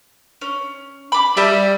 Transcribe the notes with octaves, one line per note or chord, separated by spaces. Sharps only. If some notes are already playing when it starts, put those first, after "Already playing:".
C#4
B5 D6
G3 G4 E5 A5